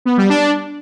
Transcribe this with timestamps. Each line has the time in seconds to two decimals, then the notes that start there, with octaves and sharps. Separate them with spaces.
0.05 B3
0.17 G3
0.29 D4